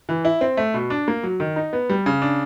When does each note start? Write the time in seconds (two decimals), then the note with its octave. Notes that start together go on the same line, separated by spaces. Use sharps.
0.09 E3
0.25 E4
0.41 C4
0.57 A3
0.74 B2
0.90 D4
1.08 A#3
1.23 F#3
1.40 D#3
1.56 D#4
1.73 B3
1.90 G3
2.06 C#3
2.22 D4